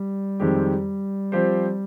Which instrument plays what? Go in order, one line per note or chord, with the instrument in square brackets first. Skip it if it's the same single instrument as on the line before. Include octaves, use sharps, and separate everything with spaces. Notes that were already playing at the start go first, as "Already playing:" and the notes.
Already playing: [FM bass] G3
[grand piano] F2 D#3 G#3 C4 G4
F3 C4 G4 C5